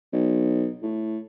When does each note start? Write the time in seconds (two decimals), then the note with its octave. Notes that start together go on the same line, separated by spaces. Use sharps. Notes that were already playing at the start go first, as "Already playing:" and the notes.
0.13 B1
0.82 A2